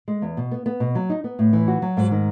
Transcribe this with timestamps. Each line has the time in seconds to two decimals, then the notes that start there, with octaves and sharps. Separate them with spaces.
0.08 G#3
0.22 E2
0.37 B2
0.51 B3
0.66 B3
0.80 B2
0.95 F#3
1.10 D#4
1.24 B3
1.39 A2
1.53 E3
1.68 F#4
1.82 F#3
1.97 G#2
2.11 D#3